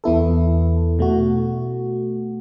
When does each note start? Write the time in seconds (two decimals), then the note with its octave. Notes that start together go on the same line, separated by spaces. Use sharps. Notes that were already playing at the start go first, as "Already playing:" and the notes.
0.04 E2 E3 B3 E4 A4
0.99 B2 A3 F#4